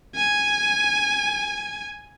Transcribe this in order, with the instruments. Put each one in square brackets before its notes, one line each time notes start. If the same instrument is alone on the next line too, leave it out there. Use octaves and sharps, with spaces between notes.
[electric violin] G#5